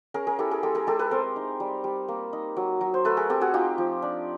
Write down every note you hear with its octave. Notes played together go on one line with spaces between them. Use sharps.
C#4 G#4 A#4
G#4 A#4
E4 G4 A4
G#4 A#4
G#3 G4 A4
G#4 A#4
G#3 G4 A4
A4 B4
C4 A#4 C5
D#4
G3
G3
A#3
D#4
F#3
F#3
C5
A3 A4 B4
G#4 A#4
C4 G4 A4
F#4 G#4
D#4 F4 G4
F3
D4